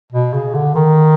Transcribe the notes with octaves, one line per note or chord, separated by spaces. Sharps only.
B2
C#3
D3
D#3